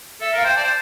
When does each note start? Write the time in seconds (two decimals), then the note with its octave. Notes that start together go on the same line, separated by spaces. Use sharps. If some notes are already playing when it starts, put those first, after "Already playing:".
0.21 A4 E5
0.33 A#4 F5
0.44 C5 G5
0.56 D5 A5
0.63 C5